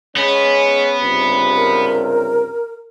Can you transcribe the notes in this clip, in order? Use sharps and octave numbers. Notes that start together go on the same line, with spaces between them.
G#3 B3 C#4
C#2 G2 C3
A#4